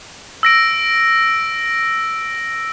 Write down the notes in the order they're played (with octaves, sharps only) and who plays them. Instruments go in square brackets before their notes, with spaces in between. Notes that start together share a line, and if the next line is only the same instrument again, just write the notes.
[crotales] E6 A#6 D7